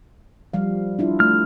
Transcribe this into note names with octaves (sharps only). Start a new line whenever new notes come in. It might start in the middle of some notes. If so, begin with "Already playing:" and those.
F3 G3 F5
D4 E4 F4
A3 F6